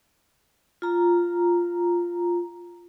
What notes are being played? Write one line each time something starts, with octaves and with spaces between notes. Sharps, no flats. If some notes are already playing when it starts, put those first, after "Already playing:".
F4 A#5